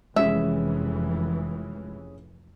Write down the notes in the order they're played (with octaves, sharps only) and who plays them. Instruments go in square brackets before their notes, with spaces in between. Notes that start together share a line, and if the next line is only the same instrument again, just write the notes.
[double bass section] F1 E3 [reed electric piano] G#3 [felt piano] C#4 G#4 [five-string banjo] E5